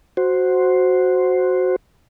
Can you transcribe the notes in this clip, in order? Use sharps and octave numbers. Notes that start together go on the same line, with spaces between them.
F#4 C5